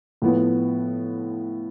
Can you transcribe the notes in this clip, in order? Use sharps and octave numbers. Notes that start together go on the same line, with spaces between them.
A2 F3 B3